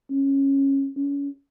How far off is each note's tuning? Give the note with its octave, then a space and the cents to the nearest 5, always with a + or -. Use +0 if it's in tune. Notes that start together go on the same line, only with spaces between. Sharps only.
C#4 -15
C#4 +30